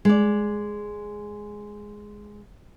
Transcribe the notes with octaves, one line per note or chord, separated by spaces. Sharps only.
G#3 D5